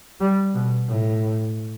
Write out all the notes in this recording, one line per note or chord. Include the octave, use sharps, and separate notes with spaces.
G3
B2
A2